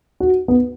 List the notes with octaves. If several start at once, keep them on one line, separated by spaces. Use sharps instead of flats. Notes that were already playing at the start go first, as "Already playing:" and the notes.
F#4
B3